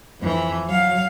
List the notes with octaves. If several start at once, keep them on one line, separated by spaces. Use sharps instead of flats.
F2 E3
F#3 F5